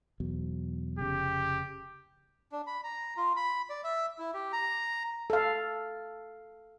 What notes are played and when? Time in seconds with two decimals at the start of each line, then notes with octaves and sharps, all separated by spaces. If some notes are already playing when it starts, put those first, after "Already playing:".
0.20 E2 B2 F#3
0.99 F1 C#3 G4
2.52 D4
2.67 B5
2.84 A#5
3.17 F4
3.37 B5
3.70 D5
3.84 E5
4.19 E4
4.34 G4
4.53 A#5
5.30 A4 F5